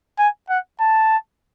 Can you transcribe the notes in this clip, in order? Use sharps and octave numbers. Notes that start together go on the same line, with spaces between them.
G#5
F#5
A5